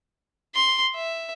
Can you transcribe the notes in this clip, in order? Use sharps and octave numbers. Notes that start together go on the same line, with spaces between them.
C6
E5